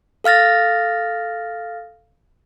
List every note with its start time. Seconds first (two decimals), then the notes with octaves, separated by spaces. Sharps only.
0.24 A4 F5 F6 A6 A#6